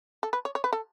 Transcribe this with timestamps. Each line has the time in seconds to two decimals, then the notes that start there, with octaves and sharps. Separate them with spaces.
0.23 A4
0.33 B4
0.45 C#5
0.55 C#5
0.64 B4
0.73 A4